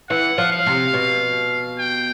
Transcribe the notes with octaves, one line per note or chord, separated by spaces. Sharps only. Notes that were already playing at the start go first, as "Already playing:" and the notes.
E3 F#5
F3
F5
C3
B2
G5